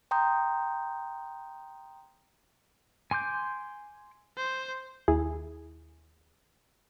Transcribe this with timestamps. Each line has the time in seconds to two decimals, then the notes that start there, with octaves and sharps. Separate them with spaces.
0.11 G5 A#5 C6 D#6 G6
3.11 G#5 C6 D6 G6
4.37 C5
5.08 D#2 E4 G#4